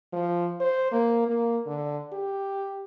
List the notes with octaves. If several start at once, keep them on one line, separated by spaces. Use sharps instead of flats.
F3
C5
A#3
A#3
D3
G4